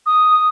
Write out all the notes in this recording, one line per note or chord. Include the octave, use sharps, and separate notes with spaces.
D#6